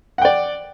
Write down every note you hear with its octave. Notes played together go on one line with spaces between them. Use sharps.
D5 F#5 G5